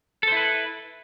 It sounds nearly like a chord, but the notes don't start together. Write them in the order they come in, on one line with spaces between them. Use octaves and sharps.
A4 C5 E4 B4